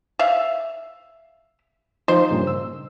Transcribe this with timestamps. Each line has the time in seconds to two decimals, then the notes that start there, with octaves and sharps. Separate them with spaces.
0.19 E5 F5
2.08 F3 D#4 C5
2.31 G2 A#2 C#3
2.47 E6